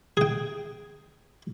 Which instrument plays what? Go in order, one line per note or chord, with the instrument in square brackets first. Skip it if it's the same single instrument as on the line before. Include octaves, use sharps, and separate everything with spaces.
[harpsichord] G#4 G5